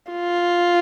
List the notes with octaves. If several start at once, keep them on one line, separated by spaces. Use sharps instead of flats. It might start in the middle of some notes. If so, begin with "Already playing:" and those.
F4